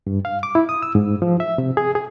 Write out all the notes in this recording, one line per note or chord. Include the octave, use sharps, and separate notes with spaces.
G2
F5
D6
E4
D#6
E6
G#2
F3
E5
C3
G#4
G#4